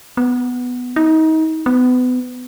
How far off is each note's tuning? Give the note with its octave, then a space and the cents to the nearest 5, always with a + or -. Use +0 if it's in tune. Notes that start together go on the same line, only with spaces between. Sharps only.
B3 +5
D#4 +30
B3 +30